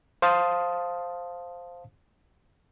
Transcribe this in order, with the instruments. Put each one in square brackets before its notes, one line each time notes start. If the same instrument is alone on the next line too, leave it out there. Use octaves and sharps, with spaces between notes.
[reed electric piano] C5 F5 A5 D#6